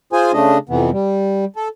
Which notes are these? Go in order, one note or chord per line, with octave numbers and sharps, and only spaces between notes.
F4 G#4 C5 G#5
C#3 A3 D4 D#5
F2 C3 E3 B3
G3
A4